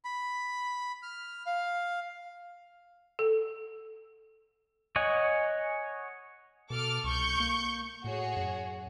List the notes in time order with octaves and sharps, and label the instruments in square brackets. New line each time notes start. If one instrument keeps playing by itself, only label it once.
[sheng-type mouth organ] B5
F6
F5
[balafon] A4
[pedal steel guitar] C#5 D#5 F#5 G#5
[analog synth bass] B2 [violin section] A4 D6 F6
[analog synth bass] C2 [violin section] C#6 G6
[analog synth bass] A#3
[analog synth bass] A2 [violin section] F#4 G#4 C#5
[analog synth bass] F#2